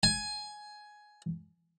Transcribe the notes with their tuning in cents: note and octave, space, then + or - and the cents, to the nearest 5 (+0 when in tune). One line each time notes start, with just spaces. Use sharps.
G#5 +10